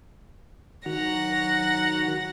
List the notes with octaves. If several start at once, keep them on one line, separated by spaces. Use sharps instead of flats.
D#3 F#3 F#4 F#5 A#5 A#6